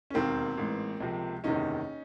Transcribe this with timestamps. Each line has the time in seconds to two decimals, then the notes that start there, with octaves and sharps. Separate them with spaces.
0.10 C#4
0.14 E1 D#2 D#3 A#3 C4
0.57 A1 G#2 E3
1.00 C#2 C3 F3
1.44 F#1 E2 C3 D#3 C#4 D#4